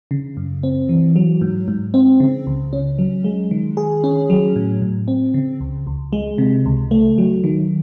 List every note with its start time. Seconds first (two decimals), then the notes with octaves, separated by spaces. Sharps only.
0.11 C#3
0.37 F#2
0.63 C4
0.89 E3
1.16 F#3
1.41 G#2
1.68 G#2
1.94 C4
2.20 C#3
2.47 C#2
2.73 C#4
2.98 F#3
3.24 G#3
3.51 D#3
3.77 G#4
4.04 C#4
4.30 F#3
4.56 A2
4.82 A2
5.08 C4
5.34 C#3
5.60 C#2
5.87 C#2
6.13 G#3
6.38 C3
6.65 C#2
6.91 A3
7.18 F#3
7.44 D#3